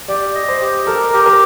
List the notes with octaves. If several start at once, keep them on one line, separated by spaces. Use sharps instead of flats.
G4 D5
D#5
C5
G4
A4 A#4
G4
A#4